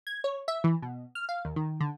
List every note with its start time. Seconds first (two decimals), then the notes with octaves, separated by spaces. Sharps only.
0.07 G#6
0.24 C#5
0.48 E5
0.64 E3
0.82 B2
1.15 F6
1.29 F5
1.45 D#2
1.56 D#3
1.81 D3